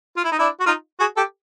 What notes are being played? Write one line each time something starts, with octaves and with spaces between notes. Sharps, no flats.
F4
E4
D#4
D4 E4
F#4
D#4 F4
F#4 G#4
G4 A4